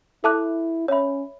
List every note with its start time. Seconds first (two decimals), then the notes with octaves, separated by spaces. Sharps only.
0.24 E4 A4 E5 A5 D6 F#6
0.88 C#4 C#5 E5 B5